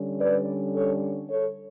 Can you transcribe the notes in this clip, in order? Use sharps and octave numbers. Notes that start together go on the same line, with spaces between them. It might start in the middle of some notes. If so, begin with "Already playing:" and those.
Already playing: D3 G3 C#4
B4 D5
A4 C#5
A4 C#5